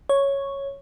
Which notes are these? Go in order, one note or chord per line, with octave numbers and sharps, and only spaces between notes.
C#5